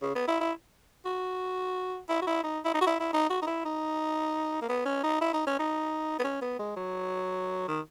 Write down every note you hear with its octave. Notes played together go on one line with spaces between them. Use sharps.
C#3
B3
E4
E4
F#4
E4
F#4
E4
D#4
E4
D#4
F#4
E4
E4
D#4
F#4
D#4
E4
D#4
A#3
B3
C#4
D#4
E4
D#4
C#4
D#4
B3
C#4
B3
G#3
F#3
D#3